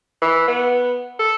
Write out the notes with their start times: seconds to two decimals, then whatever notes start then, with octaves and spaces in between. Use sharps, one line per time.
0.22 E3
0.48 B3
1.19 A4